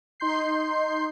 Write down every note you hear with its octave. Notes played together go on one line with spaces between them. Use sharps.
D#4 C6 G6 C7